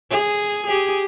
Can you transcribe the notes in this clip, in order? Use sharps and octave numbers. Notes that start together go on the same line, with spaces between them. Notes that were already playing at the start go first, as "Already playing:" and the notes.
G#4
G4 G#4